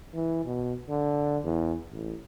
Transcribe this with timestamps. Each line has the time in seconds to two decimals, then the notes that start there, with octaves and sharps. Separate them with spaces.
0.13 E3
0.46 B2
0.89 D3
1.43 E2
1.91 A1